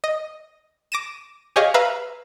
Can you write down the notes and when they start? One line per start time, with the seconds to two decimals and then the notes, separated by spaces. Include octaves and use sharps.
0.04 D#5
0.92 D6 A#6 D#7 E7
1.56 G4 G#4 C#5 D#5 F5
1.74 B4 E5 F5 A#5 B5